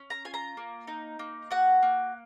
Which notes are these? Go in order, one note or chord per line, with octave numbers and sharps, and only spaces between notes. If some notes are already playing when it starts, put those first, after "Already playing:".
Already playing: C#4
A#5
F4 G#5
A#5
A#3
D#4
A#3
F#4 F#5
A#3